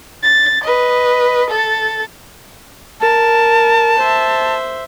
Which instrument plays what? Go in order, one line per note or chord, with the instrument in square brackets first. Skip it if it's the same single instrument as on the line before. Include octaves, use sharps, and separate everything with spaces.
[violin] A6
B4 D#5
A4 A6
[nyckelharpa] A#4 [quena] A5
[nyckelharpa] C5 E5